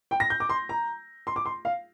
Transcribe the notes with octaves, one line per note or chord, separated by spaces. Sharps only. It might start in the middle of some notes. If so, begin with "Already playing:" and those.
G5
A#6
G6
D6
C6
A#5
C6
D6
C6
F5